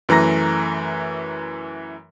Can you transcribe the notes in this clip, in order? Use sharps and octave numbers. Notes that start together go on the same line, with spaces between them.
F#2 E3 A3 A#5 A#6